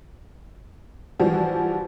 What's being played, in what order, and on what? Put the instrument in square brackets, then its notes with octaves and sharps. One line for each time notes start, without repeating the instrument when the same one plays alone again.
[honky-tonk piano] E3 F3 G3 F#4